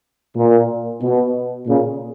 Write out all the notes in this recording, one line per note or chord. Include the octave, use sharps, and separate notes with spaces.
A#2
B2
A#2 C#3